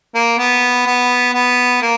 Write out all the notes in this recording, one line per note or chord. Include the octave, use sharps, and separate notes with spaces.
A#3
B3
B3
B3
A#3